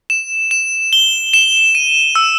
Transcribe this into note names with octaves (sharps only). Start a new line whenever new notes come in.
E7
E7
G7
E7
D#7
E6